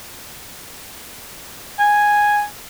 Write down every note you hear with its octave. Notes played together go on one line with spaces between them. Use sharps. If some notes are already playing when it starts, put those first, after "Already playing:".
G#5